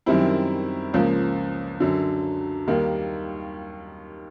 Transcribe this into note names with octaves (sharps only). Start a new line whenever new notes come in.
F#2 D#3 G3 C4 E4
C#2 C#3 F3 A#3
F#2 D3 F#3
D#2 D#3 G3 A#3